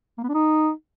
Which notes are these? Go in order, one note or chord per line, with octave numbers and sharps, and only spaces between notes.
A#3
B3
D4
D#4